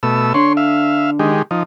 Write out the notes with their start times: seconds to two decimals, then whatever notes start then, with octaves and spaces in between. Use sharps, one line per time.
0.03 B2 A3 E6
0.34 D3 C#5 C6
0.57 E5 F5
1.19 D#3 G#3 G4
1.51 F3 D#4